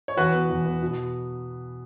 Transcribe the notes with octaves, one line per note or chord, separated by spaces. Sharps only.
C#5
E2 F#4 B4
B3
E2
B3
B2